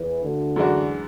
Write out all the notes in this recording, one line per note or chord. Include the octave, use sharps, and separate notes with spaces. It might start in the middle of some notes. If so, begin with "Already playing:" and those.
Already playing: E2 E3
D2 D3
F#2 E3 G#3 D4 F#4